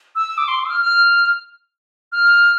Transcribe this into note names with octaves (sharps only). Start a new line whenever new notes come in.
E6
D6
C6
D6
E6
F6
F6
F6